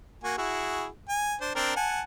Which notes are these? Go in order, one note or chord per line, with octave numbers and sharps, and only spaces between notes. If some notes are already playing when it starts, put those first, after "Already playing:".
A#3 F#4 G#5
E4 F#4 G#4
G#5
D4 C5
C4 D4 A#4
F#5 G#5 A5